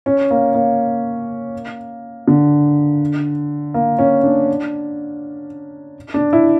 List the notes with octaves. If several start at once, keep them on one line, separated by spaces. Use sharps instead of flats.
C#4
A#3
A#3
D3
A#3
C#4
D4
D4
E4